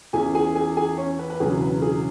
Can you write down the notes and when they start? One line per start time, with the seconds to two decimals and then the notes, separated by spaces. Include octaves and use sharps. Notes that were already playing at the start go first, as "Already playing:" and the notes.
0.13 E2 E3 C#4 G#4 G#5
0.35 G#4 G#5
0.55 G#4 G#5
0.77 G#4 G#5
0.97 C#4 C#5
1.19 B4
1.30 B4
1.40 E1 E2 C#3 F#3 G#4
1.61 B4
1.82 G#4